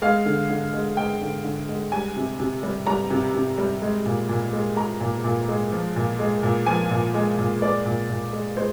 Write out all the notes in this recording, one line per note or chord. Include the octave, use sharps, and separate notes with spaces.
G#3 F5
D3
D3
G#3
G#3 G5
D3
D3
G#3
G3 G#5
C3
C3
G3
G3 A#5
C3
C3
G3
G#3
A#2
A#2
G#3
G#3 A#5
A#2
A#2
G#3
F3
A#2
G#3
A#2
F3 G#5
A#2
G#3
A#2
G#3 D5
A#2
A#2
G#3
G#3 C5